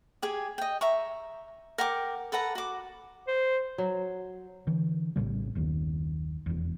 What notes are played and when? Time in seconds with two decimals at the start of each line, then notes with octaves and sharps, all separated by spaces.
0.22 G4 G#4 G#5
0.58 D#5 G5
0.81 E5 A#5 C#6
1.78 A#4 F#5 G5 D6
2.32 A4 B4 F#5 A#5
2.55 F#4 D6
3.27 C5
3.78 F#3
4.67 D3 E3
5.16 A#1 A2 C#3 G3
5.55 F#1 D#2 D#3
6.46 F1 E2